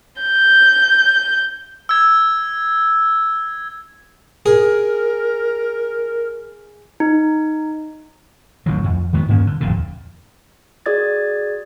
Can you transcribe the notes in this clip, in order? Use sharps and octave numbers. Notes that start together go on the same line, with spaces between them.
G6
E6 G#6
G#4 A#4
D#4
A1 D#3 F#3
F2
D#3 G#3 A3 B3
G2 A#3 C#4
D3
D1 F2 A#2 D3
F#4 G#4 D5 D#6 G#6 A6